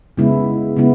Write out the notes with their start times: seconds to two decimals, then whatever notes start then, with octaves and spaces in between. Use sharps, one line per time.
0.17 C#3 G#3 B3 E4
0.77 C#3 G#3 B3 E4